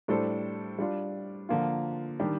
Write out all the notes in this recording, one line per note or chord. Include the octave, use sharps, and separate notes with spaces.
A2 G3 D4 A4 C5
G3 D4 F4
D3 F3 A#3 F4
D#3 G3 D4 G4